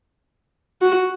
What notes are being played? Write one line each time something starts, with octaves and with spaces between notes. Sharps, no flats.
F#4